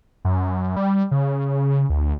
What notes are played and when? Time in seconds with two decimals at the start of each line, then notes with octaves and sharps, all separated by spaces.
0.25 F#2
0.77 G3
1.11 C#3
1.90 D2